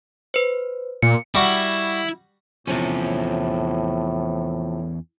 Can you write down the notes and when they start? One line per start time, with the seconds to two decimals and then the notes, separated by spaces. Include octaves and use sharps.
0.34 B4 C5
1.02 A#2 C#7
1.35 G3 E4 F#4
2.67 E2 A2 C3 F3 C#4